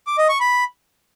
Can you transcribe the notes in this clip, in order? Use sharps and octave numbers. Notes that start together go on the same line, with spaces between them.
D6
D#5
C#6
B5